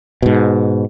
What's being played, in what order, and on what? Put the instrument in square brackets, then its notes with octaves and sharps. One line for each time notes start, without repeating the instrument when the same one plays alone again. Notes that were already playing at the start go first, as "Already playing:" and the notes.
[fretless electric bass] G#2 B2